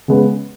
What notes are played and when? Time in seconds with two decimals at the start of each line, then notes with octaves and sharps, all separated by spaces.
0.08 C#3 G#3 B3